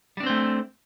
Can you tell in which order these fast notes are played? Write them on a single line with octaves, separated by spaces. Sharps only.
G3 D4 C4 C5 A3